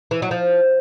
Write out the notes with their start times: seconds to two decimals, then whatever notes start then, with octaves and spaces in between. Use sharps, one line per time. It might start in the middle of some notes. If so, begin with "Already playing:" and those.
0.11 E3
0.22 F#3
0.31 F3